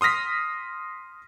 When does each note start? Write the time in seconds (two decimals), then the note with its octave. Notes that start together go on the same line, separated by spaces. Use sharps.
0.01 C6 D#6 F6 A#6 B6